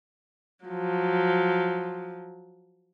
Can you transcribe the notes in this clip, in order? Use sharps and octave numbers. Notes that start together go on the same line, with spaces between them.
F3 F#3